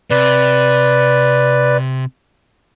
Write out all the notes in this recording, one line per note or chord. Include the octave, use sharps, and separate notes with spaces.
C3 B4 D5